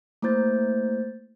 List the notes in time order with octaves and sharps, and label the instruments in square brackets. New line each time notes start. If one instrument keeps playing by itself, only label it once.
[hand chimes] A3 A#3 E4 C5 G6 A6